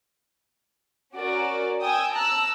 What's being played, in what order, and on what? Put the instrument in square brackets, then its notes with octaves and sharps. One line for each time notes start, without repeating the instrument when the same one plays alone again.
[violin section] C#4 F#4 A#4 D5
G5 G#5 D#6 E6
A5 A#5 E6 F#6